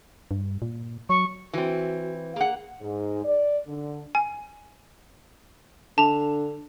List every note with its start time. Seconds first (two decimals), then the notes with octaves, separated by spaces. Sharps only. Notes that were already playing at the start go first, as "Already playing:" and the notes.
0.31 G2
0.62 A#2
1.09 F#3 C#6
1.53 E3 C4 F#4
2.36 A#3 G#4 F#5
2.81 G#2
3.25 D5
3.67 D3
4.15 G#5
5.98 D3 A5 F7